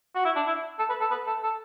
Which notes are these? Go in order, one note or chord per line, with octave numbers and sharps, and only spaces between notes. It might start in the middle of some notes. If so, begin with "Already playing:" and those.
F#4
E4
D4
E4
A4
B4
A4
B4
A4
A4